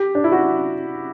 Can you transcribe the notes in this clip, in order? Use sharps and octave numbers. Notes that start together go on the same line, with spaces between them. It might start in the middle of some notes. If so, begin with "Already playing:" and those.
Already playing: G4
D4
E4
F#4